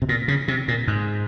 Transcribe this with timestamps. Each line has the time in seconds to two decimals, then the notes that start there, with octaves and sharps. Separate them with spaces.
0.02 C3
0.09 A#2
0.28 C#3
0.48 C3
0.68 A#2
0.87 G#2